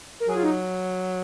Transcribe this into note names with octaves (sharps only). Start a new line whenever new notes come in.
A#4
F#3 G#4
F4
D#4